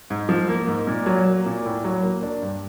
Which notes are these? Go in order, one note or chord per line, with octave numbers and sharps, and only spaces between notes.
G#2
F3
A#3
G#2
A#2
F#3
A#3
A#2
A2
F#3
A#3
D4
G2